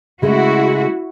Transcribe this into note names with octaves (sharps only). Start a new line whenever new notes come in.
C#3 G#3 A3 E4 F#4